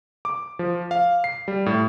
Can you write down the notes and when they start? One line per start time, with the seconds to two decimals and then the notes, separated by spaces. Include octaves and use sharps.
0.25 D6
0.59 F3
0.91 F5
1.24 C7
1.48 G3
1.66 A2